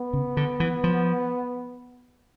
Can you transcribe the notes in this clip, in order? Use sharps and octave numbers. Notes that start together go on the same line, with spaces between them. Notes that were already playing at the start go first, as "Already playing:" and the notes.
Already playing: B3
C#3
D3
E3
F3